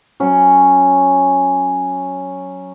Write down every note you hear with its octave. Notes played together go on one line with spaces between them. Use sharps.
F#3 C#4